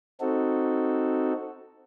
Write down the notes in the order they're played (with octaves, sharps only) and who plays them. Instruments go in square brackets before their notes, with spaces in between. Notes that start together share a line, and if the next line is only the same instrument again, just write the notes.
[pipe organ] C4 D#4 F#4 A4